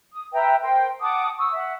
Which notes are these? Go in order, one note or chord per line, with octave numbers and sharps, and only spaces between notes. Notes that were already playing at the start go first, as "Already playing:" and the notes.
D#6
B4 E5 G5 A#5
A#4 C5 G5
F#5 A5 D6 D#6
C#6 D#6 E6
E5 F#5